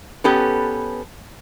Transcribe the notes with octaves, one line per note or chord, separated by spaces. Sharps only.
B3 C#4 G4 A4 B4